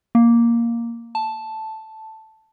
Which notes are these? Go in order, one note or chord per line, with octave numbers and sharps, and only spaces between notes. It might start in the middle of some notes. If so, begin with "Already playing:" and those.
A#3
A5